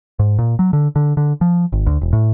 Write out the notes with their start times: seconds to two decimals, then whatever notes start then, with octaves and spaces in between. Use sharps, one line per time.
0.19 G#2
0.39 A#2
0.59 F#3
0.73 D3
0.96 D3
1.17 D3
1.41 F3
1.72 G#1
1.86 D2
2.01 E1
2.13 A2